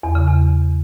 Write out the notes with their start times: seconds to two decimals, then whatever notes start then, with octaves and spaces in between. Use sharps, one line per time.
0.03 E2
0.15 C#3
0.27 E2